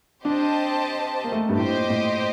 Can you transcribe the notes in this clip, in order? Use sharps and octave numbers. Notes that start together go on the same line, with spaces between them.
C4 D4 G4 C5 D#5 A5
A#3
A3
G2
A2 G4 C5 D#5
A#2
A2